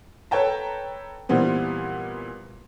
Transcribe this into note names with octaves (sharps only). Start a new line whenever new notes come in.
A4 B4 C#5 G5 A5 A#5
A#2 E3 G3 B3 C4